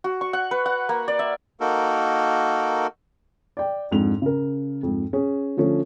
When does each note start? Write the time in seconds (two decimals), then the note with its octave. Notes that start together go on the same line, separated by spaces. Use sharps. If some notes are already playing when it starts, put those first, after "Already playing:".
0.04 F#4
0.21 C#6
0.33 F#5
0.51 B4
0.66 F#5
0.89 A#3
1.08 D5
1.19 E5
1.60 A#3 D#4 F#4 A4 A#4
3.57 D5 G5
3.91 F2 G#2 D4 F7
4.22 C#3 A#4
4.83 F2 G#2
5.13 C#4 G#4
5.57 D3 F3 A3 C#4